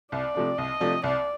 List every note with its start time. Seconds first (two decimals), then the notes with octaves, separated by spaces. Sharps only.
0.12 C2 D5
0.35 C3 F3 A3 D4
0.58 C2 D#5
0.80 C3 F3 A3 D4
1.04 C2 D5